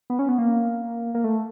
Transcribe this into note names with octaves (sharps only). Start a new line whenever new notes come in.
B3
C#4
B3
A#3
A#3
A3